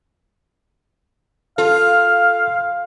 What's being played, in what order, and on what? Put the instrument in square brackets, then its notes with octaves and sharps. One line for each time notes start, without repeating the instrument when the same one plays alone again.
[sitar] F4 [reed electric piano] A4 [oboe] F5